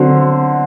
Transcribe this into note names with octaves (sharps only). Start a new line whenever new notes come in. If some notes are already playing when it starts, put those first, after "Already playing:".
Already playing: D3 F#3 C4